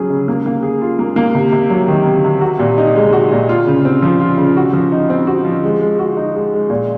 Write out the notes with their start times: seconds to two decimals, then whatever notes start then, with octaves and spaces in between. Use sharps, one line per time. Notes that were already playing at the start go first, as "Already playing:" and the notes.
Already playing: C#3 F#3 C#4 G#4
0.10 C#3
0.28 A#3
0.46 A#3
0.63 G#4
0.82 F4
0.99 A#3
1.16 A#3
1.35 C3
1.52 C3
1.70 F#3
1.88 D#3
2.07 C3
2.24 C3
2.41 F#4
2.59 A#2
2.78 D#4
2.96 G#3
3.13 F#4
3.32 A#2
3.49 F4
3.67 C#3
3.85 C4
4.02 F3
4.20 F4
4.38 C#3
4.57 F#4
4.73 F3
4.92 D#4
5.10 C4
5.27 F#4
5.45 F3
5.64 G#3
5.81 G#3
5.99 F#4
6.17 D#4
6.35 G#3
6.53 G#3
6.70 A#2